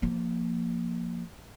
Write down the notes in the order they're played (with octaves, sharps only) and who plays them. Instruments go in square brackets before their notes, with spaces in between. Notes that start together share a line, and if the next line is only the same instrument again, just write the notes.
[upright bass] F3 A#3